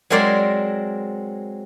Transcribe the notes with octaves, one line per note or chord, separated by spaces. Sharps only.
F#3 G#3 C4 A#4 C5 D5